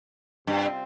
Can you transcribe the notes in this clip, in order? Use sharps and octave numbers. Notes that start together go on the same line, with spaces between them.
G2 C3 G3 C4 F4